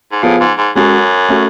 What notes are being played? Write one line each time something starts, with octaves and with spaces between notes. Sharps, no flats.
G#2
A2 F3 B3 F4 G#4
G#2
G#2
F#2 G#3 C#4 F#4 A4
A3 C#4 F#4